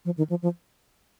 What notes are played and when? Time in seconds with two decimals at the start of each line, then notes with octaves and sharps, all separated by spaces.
0.05 F3
0.18 D#3
0.30 F3
0.42 F3